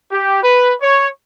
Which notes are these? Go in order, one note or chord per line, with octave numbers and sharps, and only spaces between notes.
G4
B4
C#5